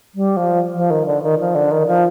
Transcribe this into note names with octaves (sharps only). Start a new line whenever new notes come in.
G3
F3
F3
D#3
D3
D#3
F3
D3
D#3
F3